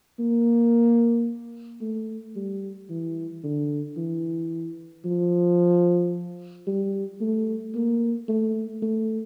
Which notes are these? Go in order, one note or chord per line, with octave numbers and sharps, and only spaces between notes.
A#3
A3
G3
E3
D3
E3
F3
G3
A3
A#3
A3
A3